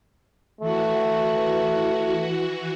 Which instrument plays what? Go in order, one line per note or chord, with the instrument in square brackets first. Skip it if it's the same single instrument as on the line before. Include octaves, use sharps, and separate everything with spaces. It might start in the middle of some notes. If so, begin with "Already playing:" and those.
[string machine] E3 F#4 [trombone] A3